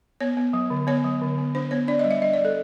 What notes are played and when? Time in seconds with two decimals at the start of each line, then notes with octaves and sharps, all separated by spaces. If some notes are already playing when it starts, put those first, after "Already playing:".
0.21 B3 C#5
0.37 B3
0.53 F#3
0.70 D3
0.87 B3 C#5
1.04 F#3
1.22 D3
1.38 B3
1.54 D4 C5
1.71 B3 C#5
1.88 D4 D5
1.99 G3 D#5
2.11 E5
2.21 G3 D#5
2.33 G3 D5
2.45 A4